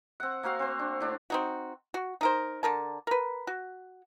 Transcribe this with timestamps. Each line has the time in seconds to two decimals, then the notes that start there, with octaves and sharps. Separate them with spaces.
0.20 C4 F#5
0.43 A#3 C4 F#4 F5
0.59 C4 C5
0.79 D4
1.00 A2 D4
1.30 C4 D#4 F#4
1.94 F#4
2.21 D#4 A#4 C5
2.63 D3 A#4 A5
3.07 A#4 B4
3.47 F#4